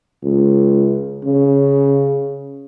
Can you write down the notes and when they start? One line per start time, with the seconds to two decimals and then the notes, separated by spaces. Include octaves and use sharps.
0.23 C#2
1.25 C#3